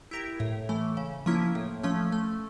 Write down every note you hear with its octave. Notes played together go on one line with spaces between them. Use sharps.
E4 G4 A#4
A2
E3 A3
C#3
F3 A#3 C#4 E4
A2
F3 A3 C#4
A3